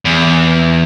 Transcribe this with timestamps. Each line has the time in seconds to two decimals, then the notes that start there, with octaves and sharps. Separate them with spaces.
0.05 E2